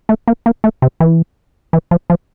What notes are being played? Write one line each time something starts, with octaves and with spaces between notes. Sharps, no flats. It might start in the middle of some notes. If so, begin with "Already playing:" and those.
A3
A#3
A#3
A3
C3
E3
E3
F3
F3